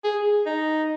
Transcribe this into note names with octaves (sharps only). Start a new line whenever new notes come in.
G#4
D#4